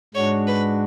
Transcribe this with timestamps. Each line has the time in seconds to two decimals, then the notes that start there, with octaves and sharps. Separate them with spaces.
0.14 G#2 G#3 D4 F#4 C#5
0.48 B4